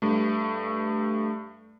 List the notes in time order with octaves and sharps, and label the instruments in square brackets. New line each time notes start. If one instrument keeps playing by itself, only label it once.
[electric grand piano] G2 A3